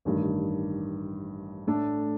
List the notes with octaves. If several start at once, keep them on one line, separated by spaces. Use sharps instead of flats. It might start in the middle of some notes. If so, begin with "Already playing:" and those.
A1 G2 D#3
A2 A3 D4 A4